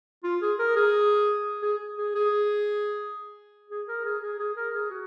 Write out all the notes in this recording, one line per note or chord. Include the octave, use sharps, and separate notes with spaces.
F4
G#4
A#4
G#4
G#4
G#4
G#4
G#4
A#4
G#4
G#4
G#4
A#4
G#4
F#4